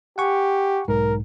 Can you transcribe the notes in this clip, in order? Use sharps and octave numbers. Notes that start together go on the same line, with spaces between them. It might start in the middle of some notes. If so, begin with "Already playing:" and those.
G4 F#5 G#5 C#6
B1 G#2 A#4